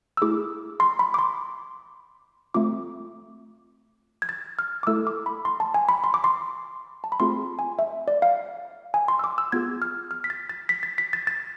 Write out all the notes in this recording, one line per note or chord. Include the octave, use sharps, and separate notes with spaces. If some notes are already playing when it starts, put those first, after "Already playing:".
E6
A3 E4 G#4 D6
C6
B5
D6
C6
A3 C4 F4 D6
G#6
A6
F6
D6
A3 E4 A4 E6
D6
B5
C6
A5
G#5
B5
C6
D6
C6
A5
B5
A3 C4 F4 G#4 C6
G#5
E5
D5
F5
G#5
C6
E6
D6
E6
B3 F4 G#4 G#6
F6
F6
B6
A6
A6
B6
A6
B6
A6
A6